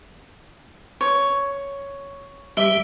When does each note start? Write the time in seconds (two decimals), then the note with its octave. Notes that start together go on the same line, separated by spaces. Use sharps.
1.01 C#5
2.57 G3 G4 E5